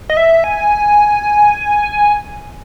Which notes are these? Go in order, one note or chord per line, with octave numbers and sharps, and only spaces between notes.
D#5
E5
G#5